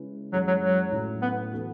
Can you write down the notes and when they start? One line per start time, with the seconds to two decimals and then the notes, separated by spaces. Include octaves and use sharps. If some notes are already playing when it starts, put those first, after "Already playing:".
Already playing: C#3 G#3 C#4 E4 B4
0.33 F#2 E3 F#3 G#3 C#4
0.47 F#3
0.63 F#3
0.92 A2 F#3 A3 C#4 E4
1.22 B3
1.52 E3 B3 F#4 A4